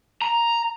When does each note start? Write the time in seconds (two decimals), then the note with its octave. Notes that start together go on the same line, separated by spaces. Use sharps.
0.22 A#5